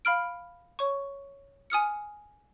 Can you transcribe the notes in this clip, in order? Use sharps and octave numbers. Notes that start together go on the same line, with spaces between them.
F5 B5 F6 D7
C#5 C#6
G#5 D#6 F6 C#7